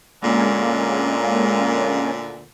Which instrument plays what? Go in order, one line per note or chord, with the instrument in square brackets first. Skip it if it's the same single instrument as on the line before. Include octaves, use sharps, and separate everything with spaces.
[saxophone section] D2 A#2 D3 [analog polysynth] G#3 A#3 C#4